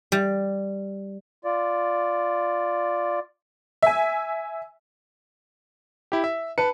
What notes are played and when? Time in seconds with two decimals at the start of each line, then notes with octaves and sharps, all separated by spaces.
0.12 G3
1.45 F4 D5
3.83 E5 G#5
6.12 E4 G4
6.24 E5
6.58 B4 A5 C#7